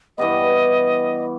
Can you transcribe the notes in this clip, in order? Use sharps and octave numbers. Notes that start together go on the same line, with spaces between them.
G2 E3 G3 B3 D#5